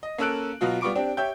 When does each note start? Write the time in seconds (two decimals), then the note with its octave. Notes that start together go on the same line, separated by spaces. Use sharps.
0.03 D#5
0.18 A#3 C#4 A4 E6 F#6 D7
0.61 B2 F#3 F4 F#4
0.81 G3 B3 F4 C#6 D6 D7
0.95 C4 D4 G4
1.17 G4 C#5 E5 G5 G6